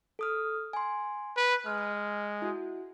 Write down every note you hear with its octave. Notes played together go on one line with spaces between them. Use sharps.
A4 D#6 F6
G#5 C6
B4
G#3 F6
E4 F#4